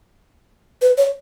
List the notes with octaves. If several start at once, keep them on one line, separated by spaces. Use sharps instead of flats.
B4
C#5